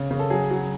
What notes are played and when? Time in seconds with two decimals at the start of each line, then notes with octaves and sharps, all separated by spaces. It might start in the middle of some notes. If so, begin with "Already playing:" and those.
Already playing: C#3
0.11 C#3
0.19 A4
0.30 F#3 G#4
0.51 F#3